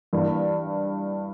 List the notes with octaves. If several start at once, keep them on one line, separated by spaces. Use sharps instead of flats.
G2 E3 A#3